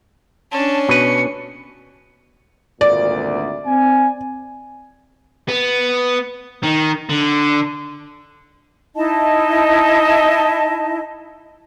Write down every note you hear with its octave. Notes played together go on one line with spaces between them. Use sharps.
C#4 D4 A5
B2 B4 C#7
G#1 D2 A#2 D5
C4 G#5
B3
D#3
D3
D#4 E4 D#5 A5